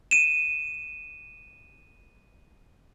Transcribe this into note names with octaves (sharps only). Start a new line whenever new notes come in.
D#7 E7